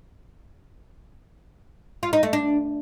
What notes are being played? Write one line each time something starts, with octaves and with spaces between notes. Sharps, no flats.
F4
D#4
A3
D4